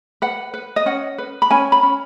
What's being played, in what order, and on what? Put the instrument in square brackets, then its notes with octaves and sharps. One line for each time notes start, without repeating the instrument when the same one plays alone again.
[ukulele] B4 F#5
B4
D#5
C#4 F#5
B4
B5
C#4 G#5
B5
C#4